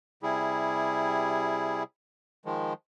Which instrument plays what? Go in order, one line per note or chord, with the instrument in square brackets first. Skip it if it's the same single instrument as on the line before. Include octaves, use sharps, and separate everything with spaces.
[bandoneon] C3 G3 E4 G#4
D#3 F3 G#3